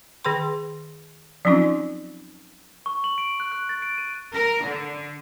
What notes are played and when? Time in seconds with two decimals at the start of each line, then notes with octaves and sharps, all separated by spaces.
0.25 D#3 G#4 B4 G5 C6
1.45 F3 F#3 C4 C#4 D#4 F4
2.86 C#6
3.04 F#7
3.18 D7
3.40 F#6
3.52 F#6
3.69 A6
3.82 D7
3.98 D#7
4.34 A#4
4.65 D3